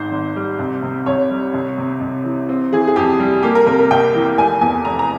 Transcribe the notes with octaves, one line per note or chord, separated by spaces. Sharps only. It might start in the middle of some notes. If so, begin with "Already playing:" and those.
Already playing: G#1 G#2 C5
G#1
G3
C2
C3
C2 C#5
G3
C2
C3
C2
E3
C4
E3 G#4
G#4
F2 G4
G3
A#3 G4
A#4
C3 A#4
A#4
C2 G5
E3
F1 G#5
E2 G#5
F1 A#5
A#5